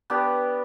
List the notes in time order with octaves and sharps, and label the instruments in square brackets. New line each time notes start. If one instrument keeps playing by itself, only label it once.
[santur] B3 D4 G4